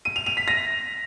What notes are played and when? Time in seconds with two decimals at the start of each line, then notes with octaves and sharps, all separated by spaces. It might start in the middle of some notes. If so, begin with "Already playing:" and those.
0.05 D#7
0.16 F7
0.26 F7
0.37 B6
0.48 A#6